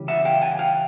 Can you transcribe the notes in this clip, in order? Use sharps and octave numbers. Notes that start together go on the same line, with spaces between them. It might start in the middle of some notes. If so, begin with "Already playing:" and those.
Already playing: C#3 E3 G3
E5 F#5
F5 G5
F#5 G#5
F5 G5